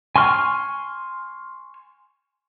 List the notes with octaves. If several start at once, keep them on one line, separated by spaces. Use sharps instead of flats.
G#5 C6 C#6 F6